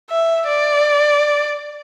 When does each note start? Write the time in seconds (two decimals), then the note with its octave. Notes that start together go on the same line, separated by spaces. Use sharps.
0.11 E5
0.47 D5